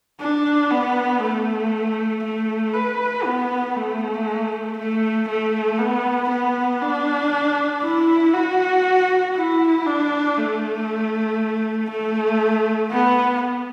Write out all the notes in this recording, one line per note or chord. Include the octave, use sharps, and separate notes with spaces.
D4
B3
A3
A3
B4
B3
A3
A3
A3
B3
B3
D4
E4
F#4
E4
D4
A3
A3
B3